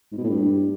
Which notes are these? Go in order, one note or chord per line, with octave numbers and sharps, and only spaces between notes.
G#2
B2
A2
G2